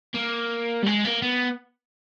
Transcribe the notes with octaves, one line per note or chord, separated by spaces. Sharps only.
A#3
G3
G#3
A#3
B3